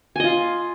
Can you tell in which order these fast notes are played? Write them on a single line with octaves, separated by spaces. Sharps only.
G#5 D#5 F4